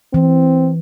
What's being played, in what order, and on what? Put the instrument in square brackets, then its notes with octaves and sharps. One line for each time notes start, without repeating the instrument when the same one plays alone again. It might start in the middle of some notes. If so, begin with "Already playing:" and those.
[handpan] E3 [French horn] C4